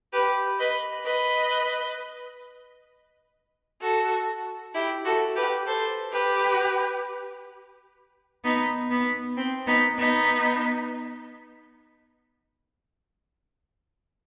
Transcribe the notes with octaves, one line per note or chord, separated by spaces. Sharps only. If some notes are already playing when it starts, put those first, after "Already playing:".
G4 B4
B4 D#5
B4 D#5
F#4 A4
E4 G4
F#4 A4
G4 B4
A4 C5
G4 B4
B3 D#4
B3
C4
B3 D#4
B3 D#4